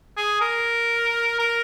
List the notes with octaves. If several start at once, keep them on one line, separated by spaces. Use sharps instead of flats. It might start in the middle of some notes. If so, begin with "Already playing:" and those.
G#4
A#4
A#4